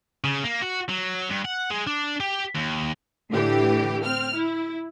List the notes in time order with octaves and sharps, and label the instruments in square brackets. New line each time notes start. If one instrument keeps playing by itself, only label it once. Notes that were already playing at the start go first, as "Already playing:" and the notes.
[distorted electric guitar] C#3
A#3
F#4
F#3
G2
F#5
G#3
D4
G4
D#2
[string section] A2 D3 E3 G4
C4 F6
E4